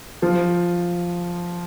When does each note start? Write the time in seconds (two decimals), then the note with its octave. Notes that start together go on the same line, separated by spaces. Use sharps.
0.22 F3